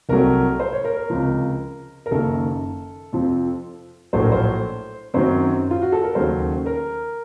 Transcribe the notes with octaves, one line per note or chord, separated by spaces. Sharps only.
C2 C3 F#3 A3 A#4
C5
C#5
A#4
A#4
C#2 C3 F3
A#4
F#1 F#2 D#3 A#3 A4
F2 C3 F3 C4
A#1 A2 F#3 A3 C5
A#4
C5
F#2 D#3 F#3 C4 C5
F4
F#4
A4
A#4
D#2 C#3 F#3 A3 C5
A#4